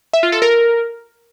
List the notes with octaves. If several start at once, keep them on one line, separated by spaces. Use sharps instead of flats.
E5
F4
A4
A#4